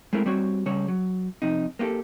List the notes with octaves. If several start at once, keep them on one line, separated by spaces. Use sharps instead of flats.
G#3 A3 C4 E4 A#4
G3 C4 F#4 C#5
C#3 G3 C#5
F#3
F2 C3 D#4
A#3 B3 F4 G4 A4